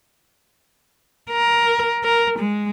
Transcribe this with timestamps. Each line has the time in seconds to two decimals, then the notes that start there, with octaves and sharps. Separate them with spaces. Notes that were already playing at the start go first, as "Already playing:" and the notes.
1.31 A#4
2.04 A#4
2.39 G#3